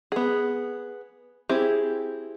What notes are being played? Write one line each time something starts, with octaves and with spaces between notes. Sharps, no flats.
B3 G#4
C4 E4 G4 G#4